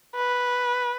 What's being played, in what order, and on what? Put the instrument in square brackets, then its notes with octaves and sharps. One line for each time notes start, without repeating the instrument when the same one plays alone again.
[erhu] B4